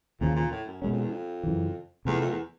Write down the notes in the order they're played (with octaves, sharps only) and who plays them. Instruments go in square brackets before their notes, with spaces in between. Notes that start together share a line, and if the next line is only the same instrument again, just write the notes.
[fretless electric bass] D#2 C#3 F3 [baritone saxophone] A#2
[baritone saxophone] A#2
A2
F#2
[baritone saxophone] F#2 [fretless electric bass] B2 G#3 C#4
[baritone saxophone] F2
E2
F2
[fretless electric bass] F#2 C#3 E3
[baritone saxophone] E2 [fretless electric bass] C3 F3 A3
[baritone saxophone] F2
E2